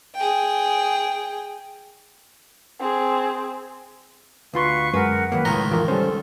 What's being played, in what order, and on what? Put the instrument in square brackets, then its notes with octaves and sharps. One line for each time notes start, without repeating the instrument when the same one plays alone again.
[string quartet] G#4 G5
[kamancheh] C4 G#4
[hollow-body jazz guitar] D2 F4 C6 [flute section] B4 F5 C#6
[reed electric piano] F#2 [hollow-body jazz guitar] G#3 B4 [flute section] A#4 F#5
[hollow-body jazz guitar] D#3 F#3 A#3 [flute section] B4
[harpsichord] C#2 D#3 [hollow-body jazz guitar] A2 [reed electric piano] A#5
[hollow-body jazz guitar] F2 E3 [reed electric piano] F4 A#4
[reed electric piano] G3 C5 [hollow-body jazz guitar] C#4 [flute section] A4